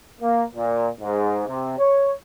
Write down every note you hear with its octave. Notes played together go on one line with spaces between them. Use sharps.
A#3
A#2
G#2
C3
C#5